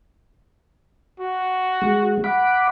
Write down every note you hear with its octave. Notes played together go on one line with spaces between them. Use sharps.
F#4
G#3
F#5 B5 D6